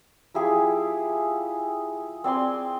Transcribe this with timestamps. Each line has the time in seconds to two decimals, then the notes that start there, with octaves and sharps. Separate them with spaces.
0.34 F3 E4 G4 G#4
2.24 C4 D5 G#5 C6